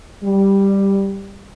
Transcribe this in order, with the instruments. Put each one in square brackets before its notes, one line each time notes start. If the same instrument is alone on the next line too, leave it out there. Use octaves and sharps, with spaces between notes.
[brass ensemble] G3